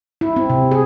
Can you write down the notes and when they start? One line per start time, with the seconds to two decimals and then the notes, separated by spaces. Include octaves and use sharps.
0.21 E4
0.36 C4
0.50 C3
0.71 G#4